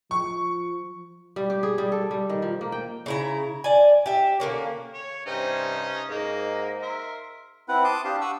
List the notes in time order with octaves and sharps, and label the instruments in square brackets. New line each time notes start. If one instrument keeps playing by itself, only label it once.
[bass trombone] F3 [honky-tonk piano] C#6
[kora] G3
G4
G#4
G3
A4
G3
D#3
F3
A#3
G5
[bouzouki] C#3 E4 A#5
D5 G#5
G4 E5
D3 A#3 C#4
[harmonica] C#5
[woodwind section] G2 C3 C5 [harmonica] C#4 D#4 D#5
[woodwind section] G#2 D#5 [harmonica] A#3
[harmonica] A#4 E5 C6
[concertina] C4 E4 B4 F#5
A5 C6 D6 D#6
D4 G4 F5 A5
F#5 C#6 D#6 E6